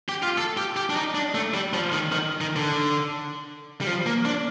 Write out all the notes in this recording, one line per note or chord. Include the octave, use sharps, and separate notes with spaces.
G4
F4
A4
G4
G4
D4
D#4
D4
A3
G3
F3
D#3
D#3
D#3
D3
G3
F3
A#3
D4